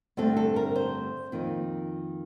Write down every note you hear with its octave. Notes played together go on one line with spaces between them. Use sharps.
G2 D3 A3 C4 A4
A4
A#4
C5
F2 D#3 A#3